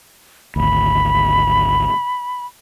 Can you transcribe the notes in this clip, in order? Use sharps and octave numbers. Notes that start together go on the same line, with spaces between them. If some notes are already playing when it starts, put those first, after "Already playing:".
G#1 D2 B5